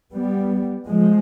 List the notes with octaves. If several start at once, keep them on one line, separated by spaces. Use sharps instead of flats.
G3 B3
F3 G#3